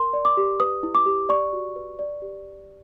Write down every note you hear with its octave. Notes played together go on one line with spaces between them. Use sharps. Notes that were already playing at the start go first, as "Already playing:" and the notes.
Already playing: A#4 C6
D5
D6
G4
B4 D#6
E4
D6
G4
D5 C#6
F#4
B4
D5
G4